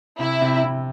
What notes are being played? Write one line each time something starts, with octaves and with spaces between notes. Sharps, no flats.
C3 E4
C3
C3